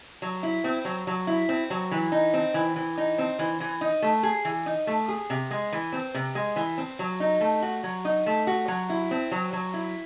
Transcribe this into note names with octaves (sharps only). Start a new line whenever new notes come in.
F#3
E4
C4
F#3
F#3
E4
C4
F#3
E3
D#4
C4
E3
E3
D#4
C4
E3
E3
D#4
A3
G#4
E3
D#4
A3
G#4
C3
G#3
E3
C4
C3
G#3
E3
C4
F#3
D#4
A3
F#4
F#3
D#4
A3
F#4
F#3
E4
C4
F#3
F#3
E4